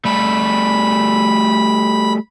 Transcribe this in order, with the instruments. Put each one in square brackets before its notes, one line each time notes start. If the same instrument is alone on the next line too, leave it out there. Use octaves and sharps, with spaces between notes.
[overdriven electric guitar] G3 A3 [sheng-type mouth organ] B5